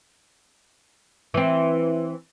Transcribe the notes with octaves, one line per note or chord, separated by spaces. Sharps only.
E3 C4